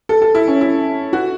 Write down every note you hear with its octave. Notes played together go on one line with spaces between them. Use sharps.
A4
A4
E4
C#4
E4
F#4